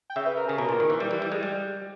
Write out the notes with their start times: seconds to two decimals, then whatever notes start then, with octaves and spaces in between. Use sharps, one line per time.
0.10 G5
0.16 C#3 E5
0.26 B4
0.37 A#4
0.48 C#3 G#4
0.58 B2 A#4
0.69 A#2
0.80 D#3
0.90 E3
1.00 G3
1.11 E3
1.22 G3
1.32 G#3
1.43 G3